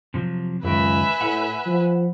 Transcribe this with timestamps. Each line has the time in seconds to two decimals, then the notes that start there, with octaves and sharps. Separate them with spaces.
0.14 C3 F3 F#3
0.63 C#2 F#2 D#3 B4 E5 G#5
1.21 A2 F#5
1.66 F3